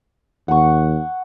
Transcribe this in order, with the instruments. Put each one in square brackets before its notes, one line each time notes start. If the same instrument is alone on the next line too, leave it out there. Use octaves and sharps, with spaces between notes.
[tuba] D#2 [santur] F#5 C#6